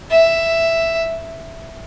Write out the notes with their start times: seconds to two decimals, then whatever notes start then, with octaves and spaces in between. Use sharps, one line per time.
0.11 E5